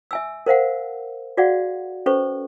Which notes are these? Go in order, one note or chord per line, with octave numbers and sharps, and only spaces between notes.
E5 G#5 E6
A#4 C5 F5 F#5
F#4 G#4 D5 F5 F#5
C#4 A4 B4 C5 C#6